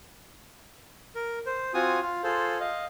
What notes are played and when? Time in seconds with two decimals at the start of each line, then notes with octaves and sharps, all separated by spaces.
1.15 A#4
1.46 C5
1.74 C4 F4 F#4 G#5 D#6
2.01 F4
2.23 F4 G#4 A4 C5
2.60 D#5 F5